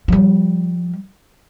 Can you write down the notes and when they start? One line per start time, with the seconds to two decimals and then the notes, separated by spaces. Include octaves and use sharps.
0.08 F3 G3